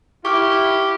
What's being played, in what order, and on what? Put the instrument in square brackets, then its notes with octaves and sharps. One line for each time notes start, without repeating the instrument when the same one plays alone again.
[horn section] E4 [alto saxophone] G4 [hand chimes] C#6 D6 F6